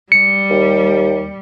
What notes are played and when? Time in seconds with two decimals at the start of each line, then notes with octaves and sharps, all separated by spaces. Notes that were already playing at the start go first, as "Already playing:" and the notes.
0.12 G3 C#7
0.50 D#2